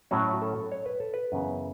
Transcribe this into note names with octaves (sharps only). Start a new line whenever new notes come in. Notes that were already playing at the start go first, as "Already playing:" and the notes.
A2 F#3 C#4 F#4
A4
C#5
B4
A4
B4
F#2 C#3 E3 B3